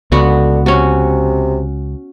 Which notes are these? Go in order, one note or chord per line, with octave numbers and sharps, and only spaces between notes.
C#2 D3 B3 F#4
C3 C#4 F#4